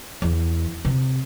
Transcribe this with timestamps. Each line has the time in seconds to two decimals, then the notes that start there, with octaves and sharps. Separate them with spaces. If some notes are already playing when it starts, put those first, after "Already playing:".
0.22 E2
0.85 C3